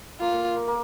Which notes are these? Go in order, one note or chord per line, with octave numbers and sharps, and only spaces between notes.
A#3 F4
A#3
A#3
A#3